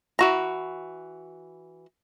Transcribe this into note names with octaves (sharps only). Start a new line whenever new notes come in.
E3 F#4 A#5